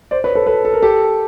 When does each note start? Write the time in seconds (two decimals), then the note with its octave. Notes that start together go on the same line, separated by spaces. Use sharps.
0.11 C5 D5
0.24 B4 C#5
0.35 A4 B4
0.46 A4 B4
0.65 A4
0.74 A#4
0.82 G4 A4